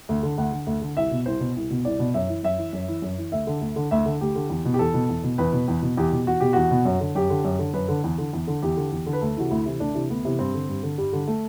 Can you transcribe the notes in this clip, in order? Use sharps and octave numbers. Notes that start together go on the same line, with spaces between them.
D2
D3
D2 F#5
D3
D2
D3
C2 E5
B2
C2 C5
B2
C2
B2
C2 D5
B2
F#2 E5
E3
F#2 E5
E3
F#2
E3
F#2
E3
D2 E5
D3
D2
D3
D2 E5
D3
D2 G4
D3
E2
B2
G4
E2 A4
B2
E2
B2
E2 B4
B2
E2
B2
E2 G4
B2
E2 F#4
B2 G4
E2 F#4
B2
F#2
D3
F#2 G4
D3
F#2
D3
F#2 B4
D3
E2
D3
E2
D3
E2 G4
D3
E2
D3
B4
D2 A4
C3 E3 F#4
D2 E4
C3 E3
D2 D4
C3 E3
D2 B3
C3 E3
G2 C4
D3
G2
D3
G2 G3
D3
A3